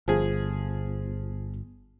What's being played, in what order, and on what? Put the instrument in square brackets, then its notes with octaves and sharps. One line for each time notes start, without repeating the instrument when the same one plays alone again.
[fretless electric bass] G1 [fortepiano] F3 G#4